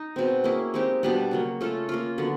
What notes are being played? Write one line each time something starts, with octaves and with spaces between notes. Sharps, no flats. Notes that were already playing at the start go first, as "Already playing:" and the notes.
Already playing: D#4
B2 G#3 C4
A#3 C#4 E4 G#4
G#3 C4 D#4 G4
B2 G3 B3 D4
C#3 F#3 A#3
A3 C#4 F4 A4
A#3 C#4 F4
D3 F#3 B3